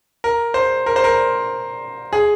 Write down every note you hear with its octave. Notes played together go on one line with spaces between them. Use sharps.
A#4
C5
A#4
C5
A#4
G#4